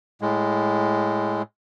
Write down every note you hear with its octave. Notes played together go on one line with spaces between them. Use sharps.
A2 G#3